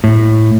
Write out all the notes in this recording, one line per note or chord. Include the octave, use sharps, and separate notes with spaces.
A2